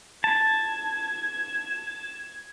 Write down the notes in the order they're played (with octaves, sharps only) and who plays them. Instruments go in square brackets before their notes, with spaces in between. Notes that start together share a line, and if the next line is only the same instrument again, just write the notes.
[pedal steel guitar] A5 [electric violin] G#6